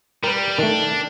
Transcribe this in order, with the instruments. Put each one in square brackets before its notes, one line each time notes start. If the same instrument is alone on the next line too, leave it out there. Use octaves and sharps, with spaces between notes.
[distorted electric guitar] G3 [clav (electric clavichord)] A#4 B4
[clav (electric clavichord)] D#3 A3 [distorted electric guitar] D4